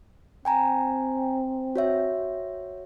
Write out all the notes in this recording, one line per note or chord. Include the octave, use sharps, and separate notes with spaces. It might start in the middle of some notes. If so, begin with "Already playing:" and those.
C4 G5 G#5 A#5
F#4 C#5 E5